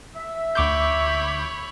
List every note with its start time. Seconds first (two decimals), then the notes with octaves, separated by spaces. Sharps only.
0.15 E5
0.55 D2 C#5 B5 D6 G6